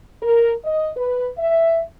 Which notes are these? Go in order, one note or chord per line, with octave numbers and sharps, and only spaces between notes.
A#4
D#5
B4
E5